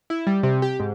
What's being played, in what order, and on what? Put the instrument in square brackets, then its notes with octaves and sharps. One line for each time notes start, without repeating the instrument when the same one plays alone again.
[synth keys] E4
G3
C3
G4
G#2